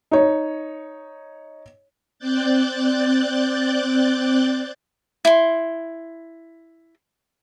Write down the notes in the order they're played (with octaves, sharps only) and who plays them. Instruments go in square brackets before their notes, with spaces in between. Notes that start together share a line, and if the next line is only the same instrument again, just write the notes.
[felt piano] D#4 C#5
[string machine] C4 D5 F#6 G6 A6
[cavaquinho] E4 C6